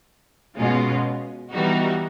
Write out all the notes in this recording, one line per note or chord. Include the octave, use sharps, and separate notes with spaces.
B2 G#3 C#4 F4
E3 G3 B3 D#4 F#4